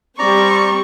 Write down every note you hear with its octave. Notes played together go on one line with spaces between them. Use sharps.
G3 C4 D5 A#5 C#6